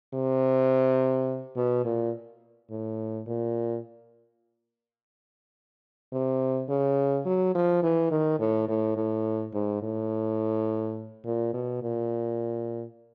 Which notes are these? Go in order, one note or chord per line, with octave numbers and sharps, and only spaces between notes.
C3
B2
A#2
A2
A#2
C3
C#3
F#3
F3
E3
D#3
A2
A2
A2
G#2
A2
A#2
B2
A#2